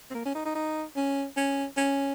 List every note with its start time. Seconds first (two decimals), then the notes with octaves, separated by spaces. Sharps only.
0.10 C4
0.14 A#3
0.25 C#4
0.35 D#4
0.45 D#4
0.55 D#4
0.96 C#4
1.37 C#4
1.77 C#4